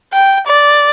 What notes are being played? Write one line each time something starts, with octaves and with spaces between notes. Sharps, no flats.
G5
D5